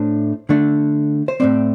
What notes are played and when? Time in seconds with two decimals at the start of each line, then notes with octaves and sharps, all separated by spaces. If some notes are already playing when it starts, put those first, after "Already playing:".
Already playing: A2 A3 D4 C5
0.49 D3 A3 D4
1.28 C5
1.40 A2 A3 C4 D5